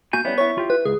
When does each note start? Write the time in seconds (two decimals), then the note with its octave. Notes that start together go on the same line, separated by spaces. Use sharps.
0.13 A#3 F#4 G#5 G6
0.25 G3 B3 C#4 E4
0.38 E4 C#5 C#6
0.58 F4 G4
0.70 B4
0.85 C#2 G#4